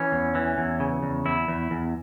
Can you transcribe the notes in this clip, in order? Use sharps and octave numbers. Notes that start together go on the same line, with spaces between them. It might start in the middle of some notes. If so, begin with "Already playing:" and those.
Already playing: E3 C#4
E2
E3
E2
C#3
E2
E2 E4
E2
E2